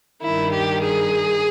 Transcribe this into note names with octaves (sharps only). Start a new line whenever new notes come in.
G2 D#3 E4
G4
G#4